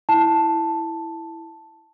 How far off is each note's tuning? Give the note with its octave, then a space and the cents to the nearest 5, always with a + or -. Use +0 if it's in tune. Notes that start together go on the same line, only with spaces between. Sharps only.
E4 +0 A5 +0